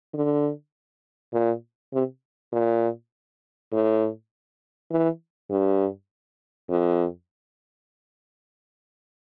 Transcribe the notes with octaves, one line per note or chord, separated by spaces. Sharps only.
D3
A#2
C3
A#2
A2
E3
G2
F2